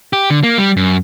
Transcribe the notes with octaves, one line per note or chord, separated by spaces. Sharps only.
G4
D3
A#3
G3
F#2